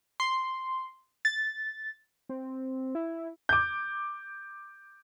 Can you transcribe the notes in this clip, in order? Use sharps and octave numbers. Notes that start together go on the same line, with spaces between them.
C6
A6
C4
E4
D6 G6